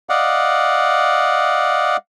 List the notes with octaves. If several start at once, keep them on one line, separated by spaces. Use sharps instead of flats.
D5 D#5 F5 F#5